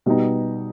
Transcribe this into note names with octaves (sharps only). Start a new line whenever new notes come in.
B2 G3 B3 D#4